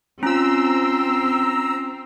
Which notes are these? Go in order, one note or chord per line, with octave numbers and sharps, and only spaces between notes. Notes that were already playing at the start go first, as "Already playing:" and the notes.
C4 C#4 F4 A#5 E6